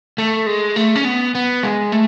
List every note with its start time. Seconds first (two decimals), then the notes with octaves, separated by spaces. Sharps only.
0.18 A3
0.46 G#3
0.76 A3
0.96 C#4
1.05 B3
1.35 B3
1.63 G#3
1.92 A3